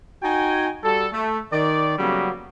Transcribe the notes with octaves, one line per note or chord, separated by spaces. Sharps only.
D#4 F#4 G5 G#5
G3 F#4 A4
A3
D#3 D5
C#3 F#3 G3 A#3 B3